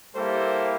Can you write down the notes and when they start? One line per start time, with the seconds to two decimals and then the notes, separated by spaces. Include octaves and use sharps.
0.14 G3 A#3 E4 G4 A4 C5